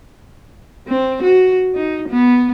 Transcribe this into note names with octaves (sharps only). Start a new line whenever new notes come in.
C4
F#4
D#4
B3